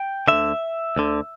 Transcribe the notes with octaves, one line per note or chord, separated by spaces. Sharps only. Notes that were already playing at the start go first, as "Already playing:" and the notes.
Already playing: G5
D2 D3 E5
D2 D3